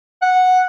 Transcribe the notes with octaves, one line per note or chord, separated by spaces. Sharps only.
F#5